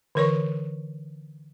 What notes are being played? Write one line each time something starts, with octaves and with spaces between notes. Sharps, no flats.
D3 E3 A#4 C#5 C#6